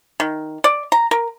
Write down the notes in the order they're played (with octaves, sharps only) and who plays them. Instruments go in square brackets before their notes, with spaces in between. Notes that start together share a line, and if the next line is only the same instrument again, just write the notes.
[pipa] D#3
D5
A#5
A#4